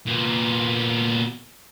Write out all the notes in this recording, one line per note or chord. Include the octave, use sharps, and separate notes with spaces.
A#2 B3